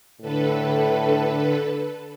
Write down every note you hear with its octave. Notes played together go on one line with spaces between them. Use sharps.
A2 D3 A4 B4